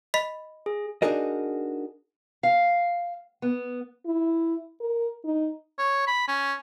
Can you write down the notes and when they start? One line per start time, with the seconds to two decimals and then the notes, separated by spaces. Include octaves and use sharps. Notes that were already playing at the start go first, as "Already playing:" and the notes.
0.14 D#5 B5 B6
0.66 G#4
1.02 D4 D#4 F#4 G#4 A#4 D#5
2.43 F5
3.42 B3
4.06 E4
4.80 A#4
5.25 D#4
5.79 C#5
6.07 B5
6.28 C#4